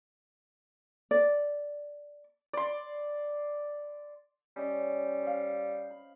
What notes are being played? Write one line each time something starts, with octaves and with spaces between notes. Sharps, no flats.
D5
D5 C6
G3 C#4 D#5
C5 F5
B5